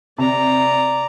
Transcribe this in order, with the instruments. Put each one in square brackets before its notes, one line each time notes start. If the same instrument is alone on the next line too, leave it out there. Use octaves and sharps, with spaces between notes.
[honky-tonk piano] C3 [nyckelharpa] D5 A#5